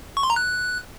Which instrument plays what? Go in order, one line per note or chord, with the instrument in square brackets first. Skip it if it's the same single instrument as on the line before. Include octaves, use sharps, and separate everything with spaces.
[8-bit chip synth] C#6
C6
A#5
F#6